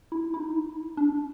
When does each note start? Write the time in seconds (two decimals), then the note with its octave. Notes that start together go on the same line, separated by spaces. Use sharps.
0.12 E4
0.34 E4
0.40 D#4
0.97 D4